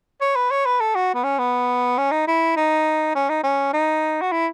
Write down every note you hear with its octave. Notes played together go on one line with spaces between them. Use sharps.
C#5
B4
C#5
B4
A4
F#4
B3
C#4
B3
C#4
D#4
E4
D#4
C#4
D#4
C#4
D#4
F#4
E4